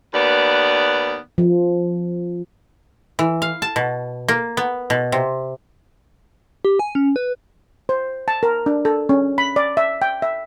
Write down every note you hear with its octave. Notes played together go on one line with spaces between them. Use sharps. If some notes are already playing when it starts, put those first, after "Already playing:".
D#2 B3 B4 D5
F3
E3
F5
A5
B2
A#3
B3
B2
C3
G4
G#5
C#4
B4
C5
A5
A#4
D4
A4
C#4
B5
D5
E5
G5
E5